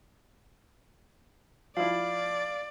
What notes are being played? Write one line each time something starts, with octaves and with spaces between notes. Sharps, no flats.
F3 E4 D5 F5